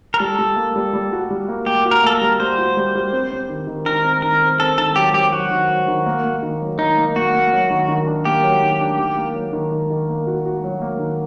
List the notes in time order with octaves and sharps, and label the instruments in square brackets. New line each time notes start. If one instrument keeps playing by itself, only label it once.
[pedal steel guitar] A#4
[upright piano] G3 [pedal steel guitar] A4
[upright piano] G3
A#3
G3
G3
F#4
G3
A#3
[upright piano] A#3 [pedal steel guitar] G4
[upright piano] F#4
[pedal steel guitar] A#4
[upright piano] A#3 [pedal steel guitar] A4
[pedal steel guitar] A#4
[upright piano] G3
[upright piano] G3 [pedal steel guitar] C5
[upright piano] F#4
G3
G3
C4
C4
D#3
D#3
[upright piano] D#3 [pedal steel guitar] A#4
[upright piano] C4
[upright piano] D#3 [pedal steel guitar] A#4
[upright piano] C4
[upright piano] C4 [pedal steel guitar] A4
[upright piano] D#3 [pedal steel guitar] A4
[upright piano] F#3 [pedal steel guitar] G4
[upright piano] F#3 [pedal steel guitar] G4
[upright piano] F#3 [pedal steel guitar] F#4
[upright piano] D#3
F#3
D#3
A#3
A#3
D#3
F#3
[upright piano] D#3 [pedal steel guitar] D#4
[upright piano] A#3
[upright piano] A#3 [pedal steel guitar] F#4
[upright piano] A#3
F#3
D#3
D#3
D4
[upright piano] A#3 [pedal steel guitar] G4
[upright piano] F#3
D#3
D4
D#3
A#3
F#3
D#3
D#3
D#3
A#3
F#4
F#4
F#3
A#3
D#3